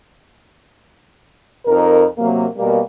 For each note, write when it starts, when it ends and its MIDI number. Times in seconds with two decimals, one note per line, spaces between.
1.66 2.04 41
1.66 2.04 63
1.66 2.04 70
2.18 2.44 48
2.18 2.44 54
2.18 2.44 58
2.56 2.79 47
2.56 2.79 55
2.56 2.79 58